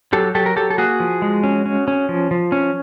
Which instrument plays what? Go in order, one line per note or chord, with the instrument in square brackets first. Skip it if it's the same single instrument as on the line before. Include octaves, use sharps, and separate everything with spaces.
[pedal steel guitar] F#3 G4 A4
F#3 G4 A4
A#4
F#3 G4 A4
A4
A#3 F#4 G#4
F3
G#3
C#4
C#4
C#4
F3
F3
C#4